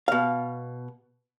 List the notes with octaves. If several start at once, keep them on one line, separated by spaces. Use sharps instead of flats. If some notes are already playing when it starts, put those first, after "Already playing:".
B2 F5